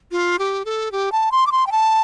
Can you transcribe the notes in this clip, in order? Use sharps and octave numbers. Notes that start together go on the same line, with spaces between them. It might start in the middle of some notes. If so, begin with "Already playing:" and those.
F4
G4
A4
G4
A5
C6
D6
C6
G5
A5